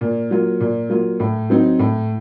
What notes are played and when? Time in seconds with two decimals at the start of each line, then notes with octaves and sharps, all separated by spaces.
0.01 A#2
0.31 F#3 A#3 F4
0.60 A#2
0.90 F#3 A#3 F4
1.20 A2
1.50 F#3 C4 D#4
1.79 A2